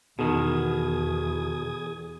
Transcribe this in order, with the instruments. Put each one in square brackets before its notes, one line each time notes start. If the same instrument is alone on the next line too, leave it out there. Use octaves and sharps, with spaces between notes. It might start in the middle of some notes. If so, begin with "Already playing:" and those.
[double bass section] E2 [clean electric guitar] B2 D#3 [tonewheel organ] G#4 D#6 G#6